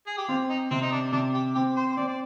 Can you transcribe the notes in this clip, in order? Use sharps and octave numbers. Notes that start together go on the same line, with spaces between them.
G#4
G4
C4 F4
D#4
C3 C4
D#4
D4
C3 D4
G4
C4 G4
C5
C5
C4 D5
D5